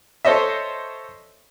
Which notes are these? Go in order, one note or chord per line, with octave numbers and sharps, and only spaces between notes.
A4 C5 C#5 D#5 E5